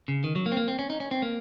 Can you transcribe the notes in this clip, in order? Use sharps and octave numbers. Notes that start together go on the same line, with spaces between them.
C#3
D#3
F#3
A#3
C4
A#3
C4
C#4
D#4
C#4
C4
A#3